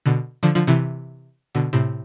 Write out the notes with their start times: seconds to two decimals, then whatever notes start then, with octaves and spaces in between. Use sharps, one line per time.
0.06 B2 D3
0.43 D3 F3
0.55 D3 F3
0.67 C3 E3
1.55 B2 D3
1.73 A2 C3